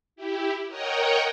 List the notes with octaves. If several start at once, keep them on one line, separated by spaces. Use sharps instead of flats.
E4 G4
A#4 C#5 D#5 F#5 G5 A#5